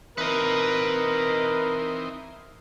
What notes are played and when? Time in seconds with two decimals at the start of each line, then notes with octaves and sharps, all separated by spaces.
0.18 E3 C4 D#4 A#4 B4 D#5